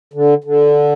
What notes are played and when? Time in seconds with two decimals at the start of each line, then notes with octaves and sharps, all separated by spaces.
0.14 D3
0.44 D3